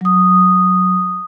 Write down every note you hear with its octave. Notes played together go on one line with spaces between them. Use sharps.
F#3 D#6